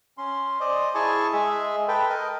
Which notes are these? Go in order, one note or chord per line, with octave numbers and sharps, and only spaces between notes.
C#4 C6
C5 D5 D#5
E4 G#4 G#5 A5 C#6
G#3 G#4 E5
A4 B4 G5
A#4 D#5